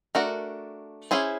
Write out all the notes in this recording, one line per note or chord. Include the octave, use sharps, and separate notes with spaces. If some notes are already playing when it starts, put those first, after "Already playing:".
A3 D4 F#4 A#4
C#4 E4 G#4 C5